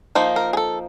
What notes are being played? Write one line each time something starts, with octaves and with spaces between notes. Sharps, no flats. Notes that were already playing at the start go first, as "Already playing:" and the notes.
F3 A#3 D#4
A#4
G#4
A4